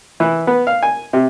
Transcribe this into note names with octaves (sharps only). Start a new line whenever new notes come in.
E3
B3
F5
G#5
C3